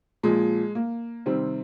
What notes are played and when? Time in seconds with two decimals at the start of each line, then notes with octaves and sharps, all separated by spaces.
0.23 A#2 F3 G#3
0.75 A#3
1.26 C3 D#3 G3 C4